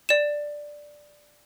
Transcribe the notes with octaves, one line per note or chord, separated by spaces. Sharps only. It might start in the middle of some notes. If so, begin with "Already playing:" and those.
D5 E7